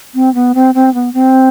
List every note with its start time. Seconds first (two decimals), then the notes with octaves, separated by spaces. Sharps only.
0.15 C4
0.34 B3
0.55 C4
0.75 C4
0.94 B3
1.14 C4